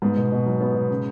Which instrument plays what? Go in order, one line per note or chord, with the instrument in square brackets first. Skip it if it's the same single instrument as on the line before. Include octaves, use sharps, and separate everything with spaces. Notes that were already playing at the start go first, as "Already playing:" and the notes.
[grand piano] G#2 [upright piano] B3
[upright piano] B2
B2
F#3
B3
B2
C#3